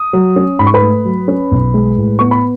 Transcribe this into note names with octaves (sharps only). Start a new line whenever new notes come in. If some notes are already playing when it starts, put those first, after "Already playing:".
Already playing: D#6
F#3
C#4
G#2 B5
C#6
B4 B5
A3
F#3
C#4
B1
G#3
A2
B3 C#6
B5